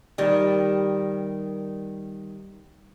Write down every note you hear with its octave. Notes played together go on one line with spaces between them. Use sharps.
D#3 G3